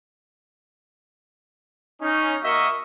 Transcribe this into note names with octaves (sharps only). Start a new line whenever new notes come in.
C#4 D#4
A#3 F#4 A#4 D#5 E5 C#6